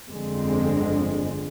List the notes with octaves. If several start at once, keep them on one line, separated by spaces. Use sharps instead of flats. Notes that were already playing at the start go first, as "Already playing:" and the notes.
G1 F2 D3 G#3 C4